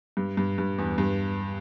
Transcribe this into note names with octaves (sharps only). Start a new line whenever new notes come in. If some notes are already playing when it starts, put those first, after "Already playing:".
G2
G2
G2
E2
G2